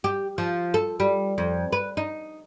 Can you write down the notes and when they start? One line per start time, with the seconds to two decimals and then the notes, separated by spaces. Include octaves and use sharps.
0.04 G4
0.38 F3
0.74 A4
1.00 G3
1.38 F2
1.72 B4
1.97 D#4